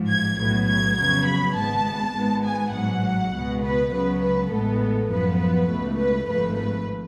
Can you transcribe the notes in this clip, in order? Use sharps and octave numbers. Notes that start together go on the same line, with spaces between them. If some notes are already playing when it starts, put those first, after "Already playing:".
Already playing: A1 G#2 F3
G#6
B1 A2 F#3 B3 G#6
G#6
F2 C#3 F#3 B3 G#6
B5
G#1 G#2 G#3 B3 A5
G#1 G#2 G#3 B3
G#5
A1 G#2 F#3 F#5
C#2 B2 G#3 B3
B4
C#2 C#3 F#3 B3 B4
B4
A1 A2 G#3 B3 A4
F#2 F3 B3 B4
B4
C#2 B2 A3
B4
G#1 G#2 F3 A3 B4
B4